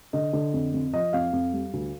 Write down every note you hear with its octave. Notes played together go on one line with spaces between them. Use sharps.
D3 D#5
D3
F2
F2
F3 D#5
F2 F5
F2
G3
D2